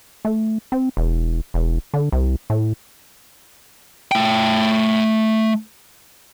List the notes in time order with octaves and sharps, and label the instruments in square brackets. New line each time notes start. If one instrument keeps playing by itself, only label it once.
[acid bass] A3
C4
E1
E1
D3
C2
A2
[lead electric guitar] A3 G5